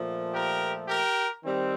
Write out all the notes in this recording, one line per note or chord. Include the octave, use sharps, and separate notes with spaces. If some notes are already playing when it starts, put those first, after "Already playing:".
Already playing: A#2 F3 A3
G4 A#4
G4 A#4
D#3 G3 C4